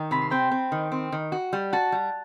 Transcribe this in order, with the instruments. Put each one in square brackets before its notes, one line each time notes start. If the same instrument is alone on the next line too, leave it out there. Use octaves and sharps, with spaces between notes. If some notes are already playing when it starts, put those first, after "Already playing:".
Already playing: [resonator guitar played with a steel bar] D#3 [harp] G5
[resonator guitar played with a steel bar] C3 [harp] B5
[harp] C6
[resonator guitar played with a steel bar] C4 [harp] G5 B5
[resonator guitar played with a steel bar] C4
D#3
C4
D#3
F#4
G3
[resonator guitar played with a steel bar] F#4 [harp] F#5 A5
[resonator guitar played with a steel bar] G3